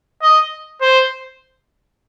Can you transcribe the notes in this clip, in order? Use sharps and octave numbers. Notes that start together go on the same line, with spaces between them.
D#5
C5